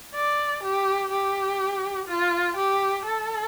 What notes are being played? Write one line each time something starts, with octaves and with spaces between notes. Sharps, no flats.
D5
G4
G4
F4
G4
A4